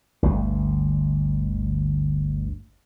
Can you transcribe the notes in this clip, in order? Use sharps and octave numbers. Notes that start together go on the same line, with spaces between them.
G1 D2